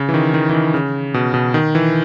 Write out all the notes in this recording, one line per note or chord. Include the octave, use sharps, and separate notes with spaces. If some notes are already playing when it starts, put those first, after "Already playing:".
Already playing: C#3
E3
D#3
D#3
E3
D#3
C#3
B2
B2
D#3
E3